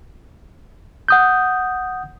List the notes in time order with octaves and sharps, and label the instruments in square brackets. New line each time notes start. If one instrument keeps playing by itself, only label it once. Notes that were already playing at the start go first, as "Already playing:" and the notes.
[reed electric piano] F#5 D#6 G6